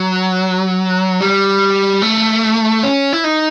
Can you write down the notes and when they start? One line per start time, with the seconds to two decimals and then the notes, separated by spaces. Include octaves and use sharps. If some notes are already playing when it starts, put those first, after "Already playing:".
Already playing: F#3
1.21 G3
2.02 A3
2.83 C#4
3.13 E4
3.24 D#4